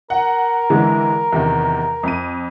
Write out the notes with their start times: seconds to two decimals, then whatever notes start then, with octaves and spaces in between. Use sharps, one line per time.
0.10 A#4 F#5
0.70 D3 E3 G#3
1.32 E2 C3 D#3
2.03 F2 D#7